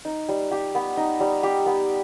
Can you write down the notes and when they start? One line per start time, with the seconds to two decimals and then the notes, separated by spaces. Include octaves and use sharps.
0.05 D#4
0.29 G3
0.51 G4
0.75 B3
0.97 D#4
1.20 G3
1.43 G4
1.66 B3